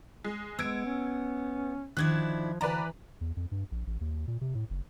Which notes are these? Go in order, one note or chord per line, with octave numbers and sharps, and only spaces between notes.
G#3
G#3 B3 E6 G#6 D7
C#4
D#3 F3 D4 E4 F#6 G#6
D2 E3 B4 D5 A5 A#5
E2
F2
G2
A#1
A1
D#2
A#2
C3
A2
F#1